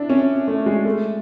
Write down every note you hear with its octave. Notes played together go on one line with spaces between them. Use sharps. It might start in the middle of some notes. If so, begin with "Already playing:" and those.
Already playing: D4 E4
C#4
A3
G#3
A3